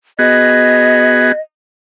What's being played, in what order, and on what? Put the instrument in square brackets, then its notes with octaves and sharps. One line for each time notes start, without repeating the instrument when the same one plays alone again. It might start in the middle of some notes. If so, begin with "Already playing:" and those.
[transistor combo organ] B3 F#4 G#4 [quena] D#5